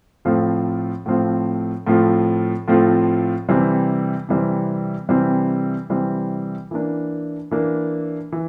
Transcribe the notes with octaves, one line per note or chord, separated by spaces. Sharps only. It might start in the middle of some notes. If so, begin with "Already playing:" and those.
A2 F3 A3 C4 F4
A2 F3 A3 C4 F4
A2 F3 A3 C4 F4
A2 F3 A3 C4 F4
C3 E3 G3 C4
C3 E3 G3 C4
C3 E3 G3 C4
C3 E3 G3 C4
E3 A#3 D4
E3 A#3 D4
E3